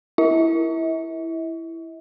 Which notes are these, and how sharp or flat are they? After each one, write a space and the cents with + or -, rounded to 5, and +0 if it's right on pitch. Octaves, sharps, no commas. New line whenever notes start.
E4 +5 E5 -45